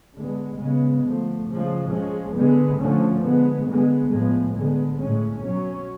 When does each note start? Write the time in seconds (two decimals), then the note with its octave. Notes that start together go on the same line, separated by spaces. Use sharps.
0.16 D3 G#3 B3
0.60 C#3 G#3 B3
1.04 D3 F3 A3
1.48 C#3 F3 G#3
1.92 F3 G#3 C#4
2.35 D3 G#3 B3
2.80 D3 F3 A3 C#4
3.23 D3 G#3 B3
3.68 D3 G#3 B3
4.11 A2 F3 G#3 B3
4.55 D3 G#3 B3
4.99 A2 G#3 C#4
5.43 B2 F#3 C#4